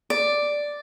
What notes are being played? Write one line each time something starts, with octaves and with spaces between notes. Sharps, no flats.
D5